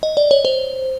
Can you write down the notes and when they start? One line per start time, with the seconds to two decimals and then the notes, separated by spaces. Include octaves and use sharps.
0.03 D#5
0.17 D5
0.31 C#5
0.45 C5